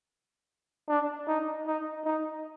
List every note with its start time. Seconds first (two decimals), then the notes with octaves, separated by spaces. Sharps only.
0.88 D4
1.27 D#4
1.67 D#4
2.05 D#4